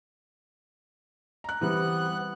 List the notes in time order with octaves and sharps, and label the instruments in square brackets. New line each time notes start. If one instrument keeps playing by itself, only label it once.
[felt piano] A#5 F#6
[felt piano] E3 G3 C4 [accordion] B3 F#6